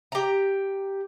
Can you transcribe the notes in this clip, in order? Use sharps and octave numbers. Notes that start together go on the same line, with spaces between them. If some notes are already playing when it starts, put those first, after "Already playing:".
G4 A#5